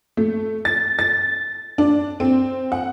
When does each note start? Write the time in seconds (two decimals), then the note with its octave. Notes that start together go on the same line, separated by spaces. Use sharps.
0.17 A3
0.65 A6
0.99 A6
1.78 D4
2.20 C4
2.72 F#5